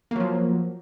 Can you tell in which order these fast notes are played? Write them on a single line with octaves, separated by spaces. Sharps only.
A#3 F#3 F3